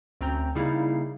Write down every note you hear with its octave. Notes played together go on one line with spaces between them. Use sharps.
D2 C4 C#4 A#5 G6
C#3 G3 A#3 D#4 E4 C7